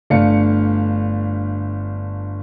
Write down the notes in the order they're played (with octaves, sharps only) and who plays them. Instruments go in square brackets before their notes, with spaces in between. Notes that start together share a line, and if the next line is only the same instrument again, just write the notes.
[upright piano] G1 A3 D4 F5 C#7